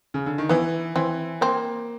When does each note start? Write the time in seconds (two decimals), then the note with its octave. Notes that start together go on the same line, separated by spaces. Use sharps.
0.14 C#3
0.26 D3
0.38 D#3
0.49 E3 B3
0.96 E3 C4
1.41 A#3 C4